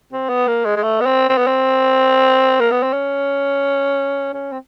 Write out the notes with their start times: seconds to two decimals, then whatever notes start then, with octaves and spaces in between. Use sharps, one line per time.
0.13 C4
0.29 B3
0.47 A#3
0.65 G#3
0.76 G#3
0.83 A3
1.00 B3
1.06 C4
1.29 C4
1.38 B3
1.47 C4
2.60 A#3
2.71 B3
2.82 C4
2.93 C#4
4.34 C#4
4.52 C4